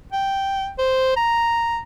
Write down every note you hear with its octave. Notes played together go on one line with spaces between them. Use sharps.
G5
C5
A#5